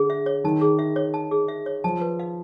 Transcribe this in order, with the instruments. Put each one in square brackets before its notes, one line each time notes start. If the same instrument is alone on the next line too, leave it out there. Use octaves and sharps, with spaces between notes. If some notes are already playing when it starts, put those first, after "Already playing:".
Already playing: [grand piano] D3 [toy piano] G#4
[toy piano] E5
C#5
[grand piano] D#3 [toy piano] A5
[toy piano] G#4
E5
C#5
A5
G#4
E5
C#5
[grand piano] F3 [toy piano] A5
[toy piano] B4
F5